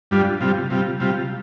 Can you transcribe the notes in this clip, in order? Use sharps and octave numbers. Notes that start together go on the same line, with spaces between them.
G2 G3 D4 F4
C3 G3 F4
C3 G3 F4
C3 G3 F4